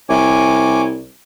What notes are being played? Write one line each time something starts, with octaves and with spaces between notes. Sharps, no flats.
C2 C#5 G#5 D6